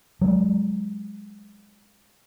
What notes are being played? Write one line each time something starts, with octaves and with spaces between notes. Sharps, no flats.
F#3 G#3